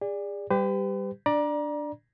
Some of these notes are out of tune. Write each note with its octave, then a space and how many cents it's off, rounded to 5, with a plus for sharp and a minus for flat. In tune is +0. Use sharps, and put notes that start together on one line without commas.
G#4 -35 D5 +0
G3 +0 G4 +10 B4 +45
D4 +0 D5 +15 A#5 +30